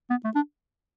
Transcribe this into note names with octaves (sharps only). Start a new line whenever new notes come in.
B3
A3
D4